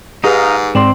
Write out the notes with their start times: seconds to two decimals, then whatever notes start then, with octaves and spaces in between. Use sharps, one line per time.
0.24 G#2 D#4 G4 G#4 B4 F5
0.75 G#2 C4 D5 G5 C6 F#7